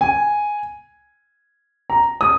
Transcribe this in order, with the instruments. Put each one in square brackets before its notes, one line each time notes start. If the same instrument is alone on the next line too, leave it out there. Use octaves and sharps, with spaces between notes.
[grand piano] G#5
A#5
D#6